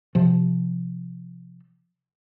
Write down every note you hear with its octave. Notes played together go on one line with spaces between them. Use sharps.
C3 F3